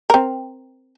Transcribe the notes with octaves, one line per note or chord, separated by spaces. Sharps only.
C4 A#4